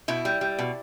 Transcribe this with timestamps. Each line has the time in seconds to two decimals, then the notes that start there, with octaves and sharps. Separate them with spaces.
0.08 B2 E4
0.25 G3
0.41 G3
0.59 B2